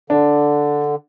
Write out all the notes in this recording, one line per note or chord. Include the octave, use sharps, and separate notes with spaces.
D3 D4